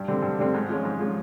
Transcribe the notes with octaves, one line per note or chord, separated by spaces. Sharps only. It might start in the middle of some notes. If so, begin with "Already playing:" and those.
Already playing: G2
D3 G3 C4
G2
D3 G3 C4
G#2
F3 G#3 C#4
G#2
F3 G#3 C#4